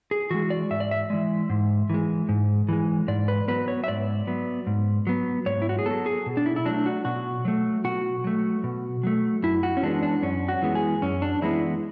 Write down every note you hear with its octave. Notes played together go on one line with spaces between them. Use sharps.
G#4
E3 G#3 F#4
D5
G#2 E5
D5
E5
E3 G#3
G#2
E3 G#3
G#2
E3 G#3
G#2 D5
B4
F#3 B3 B4
C#5
E5
G#2 D5
F#3 B3
G#2
F#3 B3
G#2 C#5
E4
F#4
G#4
F#3 B3 A4
G#4
B2
D4
E4
E4
F#3 A3 D4
F#4
B2 F#4
F#3 A3
B2 F#4
F#3 A3
B2
F#3 A3
F#2 E4
F#4
C#4
E3 G#3 B3 D4
D4
F#2 C#4
F#4
E3 G#3 B3
G#4
F#2 C#4
D4
E3 G#3 B3 E4